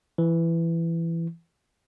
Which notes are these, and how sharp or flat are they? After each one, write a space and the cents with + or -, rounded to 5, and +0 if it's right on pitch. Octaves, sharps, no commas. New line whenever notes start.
E3 +15